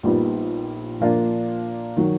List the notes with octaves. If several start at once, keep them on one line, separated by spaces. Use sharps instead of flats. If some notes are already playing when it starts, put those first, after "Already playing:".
A#1 A#2 G3 B3 D#4
A#2 F3 A#3 D4 F4
D#3 F#3